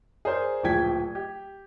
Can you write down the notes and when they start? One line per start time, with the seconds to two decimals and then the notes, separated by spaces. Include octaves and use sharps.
0.25 G#4 A#4 C5 D5
0.63 D1 A#1 F3 G5 G#6 B6
1.15 G4